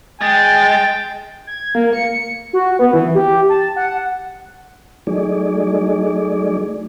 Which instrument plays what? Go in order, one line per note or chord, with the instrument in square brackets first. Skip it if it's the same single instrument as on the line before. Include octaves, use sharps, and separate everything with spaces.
[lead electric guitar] G#3 [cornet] G5 [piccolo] A6
[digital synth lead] G#6
A#3
C#7
F#4
B3
E3
G4
A5
F#5
[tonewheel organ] F#3 A3 D#4 G#4 D5